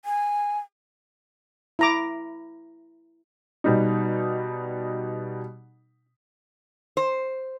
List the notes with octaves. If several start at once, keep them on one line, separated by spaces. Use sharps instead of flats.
G#5
E4 A#5 D6
B2 G3 D#4
C5